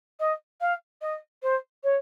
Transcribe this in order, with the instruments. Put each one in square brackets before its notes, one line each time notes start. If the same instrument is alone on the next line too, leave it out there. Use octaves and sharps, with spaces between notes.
[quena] D#5
F5
D#5
C5
C#5